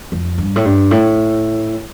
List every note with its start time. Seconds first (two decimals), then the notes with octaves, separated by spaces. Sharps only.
0.12 F2
0.38 G2
0.56 A2
0.65 G2
0.91 A2